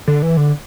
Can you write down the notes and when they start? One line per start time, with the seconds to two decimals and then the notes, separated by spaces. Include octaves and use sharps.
0.08 D3
0.22 E3
0.37 D3